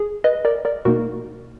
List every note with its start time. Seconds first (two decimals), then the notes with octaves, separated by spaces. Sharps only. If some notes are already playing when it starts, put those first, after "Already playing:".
Already playing: G#4
0.24 B4 D#5
0.45 A#4 D5
0.65 A#4 D5
0.85 B2 A#3 D#4 F#4 A#4